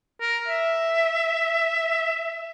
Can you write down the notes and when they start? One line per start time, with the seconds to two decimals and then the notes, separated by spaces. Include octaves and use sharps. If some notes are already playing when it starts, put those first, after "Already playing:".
0.21 A#4
0.48 E5